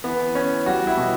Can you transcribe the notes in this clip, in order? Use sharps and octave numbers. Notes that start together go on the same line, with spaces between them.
E3 B3
E3 C#4
G3 F#4
E4
B2